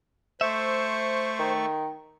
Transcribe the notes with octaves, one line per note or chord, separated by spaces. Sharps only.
A3 C5 E5 C#6
D#3